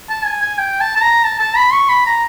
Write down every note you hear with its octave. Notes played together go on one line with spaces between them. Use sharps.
A5
G#5
G#5
G5
A5
A5
A#5
A5
A5
B5
C#6
B5
A#5